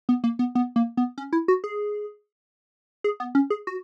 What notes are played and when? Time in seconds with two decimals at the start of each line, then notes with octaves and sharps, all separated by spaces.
0.09 B3
0.24 A#3
0.39 B3
0.55 B3
0.76 A#3
0.97 B3
1.18 C#4
1.33 E4
1.48 F#4
1.64 G#4
3.04 G#4
3.20 B3
3.35 C#4
3.50 G#4
3.67 F#4